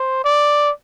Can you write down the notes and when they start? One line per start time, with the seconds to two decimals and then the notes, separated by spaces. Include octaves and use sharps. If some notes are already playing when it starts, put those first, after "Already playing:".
Already playing: C5
0.25 D5